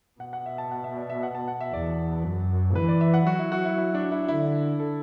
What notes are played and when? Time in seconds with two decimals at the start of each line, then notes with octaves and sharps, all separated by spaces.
0.20 B2 F#5
0.33 F#5
0.46 E5
0.58 A5
0.71 F#5
0.84 E5
0.97 D5
1.10 E5
1.23 F#5
1.35 A5
1.48 F#5
1.61 E5
1.73 E2 D5
2.24 F#2
2.75 E3 B4
2.88 D5
3.01 E5
3.14 F#5
3.27 F#3 F#4
3.39 E4
3.52 F#4
3.65 E4
3.78 E4
3.95 D4
4.12 E4
4.28 D3 E4
4.80 A4